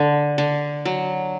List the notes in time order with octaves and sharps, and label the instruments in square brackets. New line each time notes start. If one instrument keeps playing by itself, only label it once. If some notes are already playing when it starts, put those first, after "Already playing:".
Already playing: [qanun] D3
D3
F#3